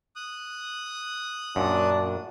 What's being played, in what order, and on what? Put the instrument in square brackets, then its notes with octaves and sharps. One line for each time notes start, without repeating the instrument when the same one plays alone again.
[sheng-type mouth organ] D#6 F#6
[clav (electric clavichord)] F#2 A#2 [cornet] D4